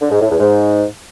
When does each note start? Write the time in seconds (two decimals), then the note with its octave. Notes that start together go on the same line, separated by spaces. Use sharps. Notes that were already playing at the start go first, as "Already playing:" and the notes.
0.01 D3
0.11 G#2
0.21 A2
0.30 E2
0.40 G#2